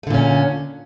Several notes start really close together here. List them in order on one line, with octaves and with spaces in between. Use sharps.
A3 D3 A#2 C#4